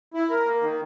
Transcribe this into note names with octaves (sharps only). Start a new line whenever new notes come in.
E4
A#4
A#3
D#3